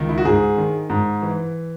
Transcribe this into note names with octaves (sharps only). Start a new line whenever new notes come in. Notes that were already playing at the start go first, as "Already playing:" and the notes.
Already playing: C#2 D#3
E4
F#4
G#2 G#4
D#3
G#2
E3